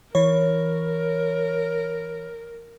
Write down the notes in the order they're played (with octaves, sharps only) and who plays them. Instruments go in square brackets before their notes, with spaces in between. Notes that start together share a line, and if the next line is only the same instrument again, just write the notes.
[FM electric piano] E3 C#5 [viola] A#4